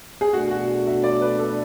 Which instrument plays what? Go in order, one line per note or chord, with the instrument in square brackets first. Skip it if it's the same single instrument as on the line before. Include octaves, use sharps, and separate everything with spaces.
[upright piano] G#4
[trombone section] B2 A3 D4 [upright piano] F#4
[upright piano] F#4
E5
D5
B4
A4